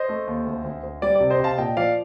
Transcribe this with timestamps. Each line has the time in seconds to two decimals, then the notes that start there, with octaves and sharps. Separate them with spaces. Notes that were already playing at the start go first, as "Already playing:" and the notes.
Already playing: C5 D#5
0.09 A3
0.27 D#2
0.46 D2
0.64 D2
0.83 D2
1.02 G3 D5
1.15 C3 D5
1.30 C5 D#5
1.39 C3 F5 A5
1.58 A#2 D#5 G5
1.77 F3 D5 F5